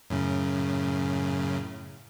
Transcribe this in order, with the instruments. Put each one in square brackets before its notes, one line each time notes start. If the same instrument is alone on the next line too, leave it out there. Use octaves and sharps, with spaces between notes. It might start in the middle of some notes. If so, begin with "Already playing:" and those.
[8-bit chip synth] F#2 A2 C#3